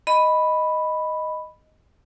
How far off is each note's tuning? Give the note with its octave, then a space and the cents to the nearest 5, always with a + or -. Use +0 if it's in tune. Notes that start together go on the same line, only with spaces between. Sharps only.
D#5 +0 B5 +0